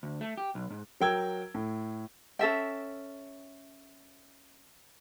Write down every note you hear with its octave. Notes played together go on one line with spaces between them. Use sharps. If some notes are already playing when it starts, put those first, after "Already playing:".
D2
A3
G4
B1
G#2
F#3 A#4 G5 E6 G#6
A2
C#4 A4 E5 G5